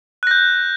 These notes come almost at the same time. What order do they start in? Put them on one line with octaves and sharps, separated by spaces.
F#6 A#6 G6